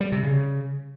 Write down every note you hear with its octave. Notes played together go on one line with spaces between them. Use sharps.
G3
C3
C#3